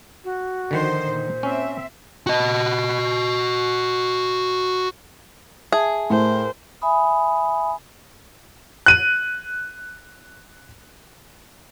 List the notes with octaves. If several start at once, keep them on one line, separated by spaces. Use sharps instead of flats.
F#4
D3 D#3 F3 D#4 C5
A#2 C5
C4 C#4 E5
F#4 D#5
G#4 E5 A5
A2 A#4 C5
E5 G#5 B5 D#6
F#6 D#7